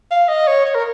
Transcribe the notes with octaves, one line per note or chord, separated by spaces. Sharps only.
F5
D#5
C#5
C#5
A#4